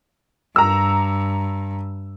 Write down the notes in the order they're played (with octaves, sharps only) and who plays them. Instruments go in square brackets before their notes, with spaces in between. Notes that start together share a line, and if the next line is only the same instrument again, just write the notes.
[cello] G2 [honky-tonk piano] A#5 E6